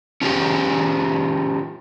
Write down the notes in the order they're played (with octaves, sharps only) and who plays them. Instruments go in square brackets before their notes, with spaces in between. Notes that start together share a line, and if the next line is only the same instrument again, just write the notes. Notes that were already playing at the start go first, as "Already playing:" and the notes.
[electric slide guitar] C#4 F4 G4 G#4